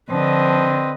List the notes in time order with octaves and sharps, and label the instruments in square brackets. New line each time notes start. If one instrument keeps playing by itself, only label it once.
[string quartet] D3 [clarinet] F3 [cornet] C4 [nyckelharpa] B4 D#5